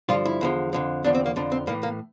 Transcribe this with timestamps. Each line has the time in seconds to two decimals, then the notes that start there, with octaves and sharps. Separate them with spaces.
0.09 G2 D3 F3 F4
0.25 E4
0.41 E2 D3 F3
0.73 F2 D3 F3
1.04 E2 D3 F3 D4
1.15 C4
1.26 A#3
1.36 F2 D3 F3 D4
1.52 C4
1.67 A2 E3 A#3
1.83 A#3